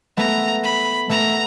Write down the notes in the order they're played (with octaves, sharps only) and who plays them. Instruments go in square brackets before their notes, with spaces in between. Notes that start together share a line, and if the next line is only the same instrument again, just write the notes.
[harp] A3 B3 [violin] A#5
[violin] B5
[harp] A3 B3 [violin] A#5